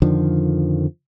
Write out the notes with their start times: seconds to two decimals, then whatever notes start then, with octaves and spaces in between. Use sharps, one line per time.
0.02 F2 D3 D#3 F3